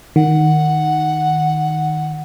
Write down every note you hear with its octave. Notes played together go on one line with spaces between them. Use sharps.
D#3 F#5